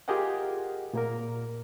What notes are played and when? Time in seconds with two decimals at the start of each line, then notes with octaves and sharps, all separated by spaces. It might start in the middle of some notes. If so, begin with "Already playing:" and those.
0.08 F4 G4 G#4 A#4 D#5 F#5
0.94 A#2 A#3 A#4